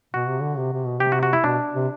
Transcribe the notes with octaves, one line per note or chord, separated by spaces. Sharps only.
B2 F#4
C3
D3
C3
C3
B2
C3 G4
F#4
F#4
E4
B2 D4
C3